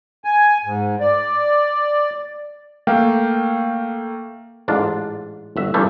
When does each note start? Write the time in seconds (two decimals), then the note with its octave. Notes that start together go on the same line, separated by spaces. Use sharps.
0.24 G#5
0.65 G#2
1.00 D5
2.87 A3 A#3 F5 G5
4.68 A1 G#2 D4 F4
5.57 G1 F#4 E5
5.74 G2 C3 E3 G3 A3